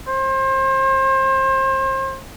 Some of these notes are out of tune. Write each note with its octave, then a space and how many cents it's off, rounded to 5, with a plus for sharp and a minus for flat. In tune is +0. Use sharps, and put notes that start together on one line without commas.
C5 +35